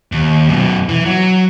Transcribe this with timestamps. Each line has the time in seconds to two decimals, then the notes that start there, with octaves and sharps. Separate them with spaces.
0.12 D#2
0.49 F#2 B2
0.89 E3
1.05 F#3